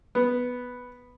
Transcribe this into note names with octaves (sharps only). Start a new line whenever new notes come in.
B3